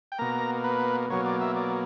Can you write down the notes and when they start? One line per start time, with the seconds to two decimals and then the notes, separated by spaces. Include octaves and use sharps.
0.12 G5
0.19 B2 A#3 A#5
0.64 B4
1.10 B2 F#3 A#3 C#5
1.26 D5
1.41 E5
1.56 D5